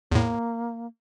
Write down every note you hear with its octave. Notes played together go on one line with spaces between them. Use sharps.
E2 A2 A#3